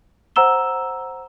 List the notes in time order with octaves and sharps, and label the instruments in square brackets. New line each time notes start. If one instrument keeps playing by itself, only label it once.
[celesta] C5 F#5 A#5 E6 E7 G7